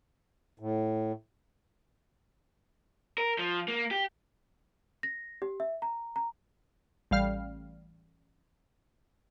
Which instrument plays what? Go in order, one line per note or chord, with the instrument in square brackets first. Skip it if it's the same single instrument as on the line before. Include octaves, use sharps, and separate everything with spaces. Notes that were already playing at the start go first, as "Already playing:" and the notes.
[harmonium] A2
[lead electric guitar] A#4
F3
A#3
G4
[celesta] A#6
G4
E5
A#5
A#5
[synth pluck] A1 G3 F5 F6